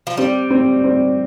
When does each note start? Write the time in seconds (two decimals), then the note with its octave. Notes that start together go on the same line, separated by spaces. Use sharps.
0.07 F3
0.17 G3 C4
0.50 C4
0.84 C4